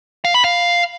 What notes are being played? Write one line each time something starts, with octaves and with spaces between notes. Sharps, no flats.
F5
B5
F5